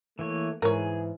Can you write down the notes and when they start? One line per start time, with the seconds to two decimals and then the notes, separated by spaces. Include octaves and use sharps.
0.19 E3 A3 A#3 C#5
0.62 G#2 E3 G#4 A#4 C#5